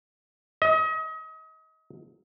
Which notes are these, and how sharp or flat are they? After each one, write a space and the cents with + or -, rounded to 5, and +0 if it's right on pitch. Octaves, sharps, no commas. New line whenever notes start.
D#5 +35